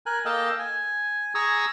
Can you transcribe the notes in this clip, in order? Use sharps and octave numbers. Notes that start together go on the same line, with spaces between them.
A#4 G#5 F#6
A#3 A4 D#5 F5 G5 A5
G#5
G#4 G#5 A#5 C#6 D#6 E6